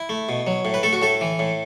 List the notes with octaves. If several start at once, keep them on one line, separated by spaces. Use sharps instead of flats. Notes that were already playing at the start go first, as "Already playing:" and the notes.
Already playing: E4
A3
B2
F#3
A2
B4
A3 A4
F#4
A2 A4
E3
A2